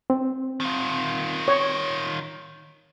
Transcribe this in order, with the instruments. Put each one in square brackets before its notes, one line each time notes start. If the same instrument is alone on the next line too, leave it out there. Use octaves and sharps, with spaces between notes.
[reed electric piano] C4
[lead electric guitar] D#3 F4
[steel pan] C#5